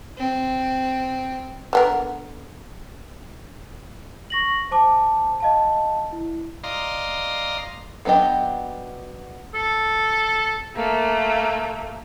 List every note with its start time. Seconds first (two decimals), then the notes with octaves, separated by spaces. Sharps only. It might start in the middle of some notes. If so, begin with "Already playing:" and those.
0.17 C4
1.73 D3 B3 A#4
4.30 C#6 A#6 F#7
4.71 C5 A5 D6
5.40 D#5 F5 A5
6.12 E4
6.64 D5 D#5 F5 A#5 C6
8.05 F#3 B3 D4 G4 D#5
9.54 A4
10.76 A3 A#3